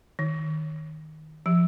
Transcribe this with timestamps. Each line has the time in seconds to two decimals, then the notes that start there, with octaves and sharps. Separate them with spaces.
0.19 D#3
1.46 F3